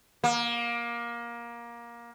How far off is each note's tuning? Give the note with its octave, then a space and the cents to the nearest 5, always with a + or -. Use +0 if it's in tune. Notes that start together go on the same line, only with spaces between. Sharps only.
A#3 +20